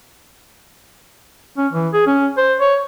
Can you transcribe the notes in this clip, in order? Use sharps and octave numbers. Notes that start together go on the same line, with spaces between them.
C#4
E3
G#4
C#4
C5
C#5